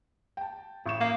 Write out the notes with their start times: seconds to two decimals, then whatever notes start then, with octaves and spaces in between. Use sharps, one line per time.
0.37 G5 A5
0.86 A1 C#6 E7
1.01 A#3